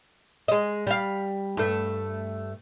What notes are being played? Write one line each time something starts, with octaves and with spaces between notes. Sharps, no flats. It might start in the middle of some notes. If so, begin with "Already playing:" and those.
G#3 D#5
G3 F5
G2 A3